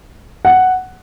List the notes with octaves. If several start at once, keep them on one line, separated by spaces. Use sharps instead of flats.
F#5